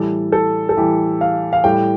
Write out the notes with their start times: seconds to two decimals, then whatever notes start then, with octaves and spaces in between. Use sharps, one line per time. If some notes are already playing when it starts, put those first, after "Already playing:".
Already playing: A2 E3 G3 A4
0.32 A4
0.69 A4
0.77 A2 E3 G3 G4
1.21 F5
1.53 F5
1.64 A2 G3 G5